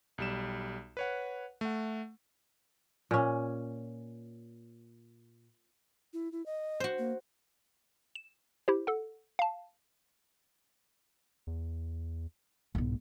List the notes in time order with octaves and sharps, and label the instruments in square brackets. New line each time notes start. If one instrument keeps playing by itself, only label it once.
[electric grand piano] B1 G3 E7
B4 C#5 F#5
A3 F#5
[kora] A#2 C#4
[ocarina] E4
E4
D#5
[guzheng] F#4 C5
[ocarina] A#3
[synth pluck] E7
E4 G4 C5
A4 F#5
F5 A5
[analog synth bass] E2
[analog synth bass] C2 [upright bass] G#2 B2